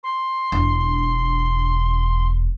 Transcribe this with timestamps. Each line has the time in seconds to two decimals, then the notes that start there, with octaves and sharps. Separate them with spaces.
0.03 C6
0.52 E1 D4